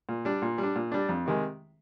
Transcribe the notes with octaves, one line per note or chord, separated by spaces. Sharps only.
A#2
G3 D4
A#2
G3
D4
A#2
G3 D4
F2
C3 D#3 G#3